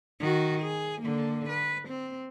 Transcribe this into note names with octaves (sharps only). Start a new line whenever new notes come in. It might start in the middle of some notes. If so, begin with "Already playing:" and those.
D#3 F#4
G#4
D3 A#3
B4
C4